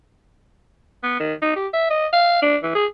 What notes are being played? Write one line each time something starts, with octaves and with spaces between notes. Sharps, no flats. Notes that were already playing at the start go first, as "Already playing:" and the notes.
B3
D#3
D#4
G4
E5
D#5
F5
D4
E3
G#4